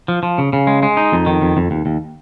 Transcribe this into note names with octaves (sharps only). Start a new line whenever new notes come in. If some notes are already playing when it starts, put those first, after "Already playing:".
F3
F3
C#3
C#3
G#3
G#3
D#4
F2
D#3
F2
F2
D#2
D#2